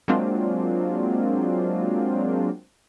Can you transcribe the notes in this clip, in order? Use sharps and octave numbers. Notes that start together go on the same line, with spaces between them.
F#3 G#3 A#3 C4 D4 F4